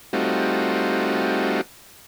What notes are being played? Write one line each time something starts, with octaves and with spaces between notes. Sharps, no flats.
G3 A3 C4 D#4 F4 F#4